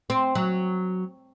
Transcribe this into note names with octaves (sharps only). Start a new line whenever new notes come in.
C4
F#3